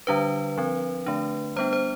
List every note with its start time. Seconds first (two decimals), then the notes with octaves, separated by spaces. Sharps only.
0.07 D3 G3 D4 B4
0.58 F3 C4
1.06 D3 A3 D4
1.56 G3 B3 D4 C5
1.73 C5